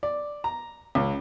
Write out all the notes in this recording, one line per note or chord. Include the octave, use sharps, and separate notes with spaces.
D5
A#5
C#2